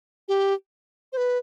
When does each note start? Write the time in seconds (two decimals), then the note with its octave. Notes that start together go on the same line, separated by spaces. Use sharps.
0.28 G4
1.13 C5
1.17 B4